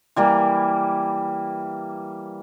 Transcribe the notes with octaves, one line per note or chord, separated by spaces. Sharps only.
E3 G3 A#3